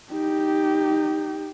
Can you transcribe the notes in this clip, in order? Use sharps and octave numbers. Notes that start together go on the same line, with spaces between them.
D#4 G4